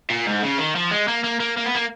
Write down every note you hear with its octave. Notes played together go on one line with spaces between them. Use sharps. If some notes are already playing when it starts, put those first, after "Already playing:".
A#2
G#2
C#3
D#3
F3
G#3
A#3
A#3
A#3
A#3
B3
A#3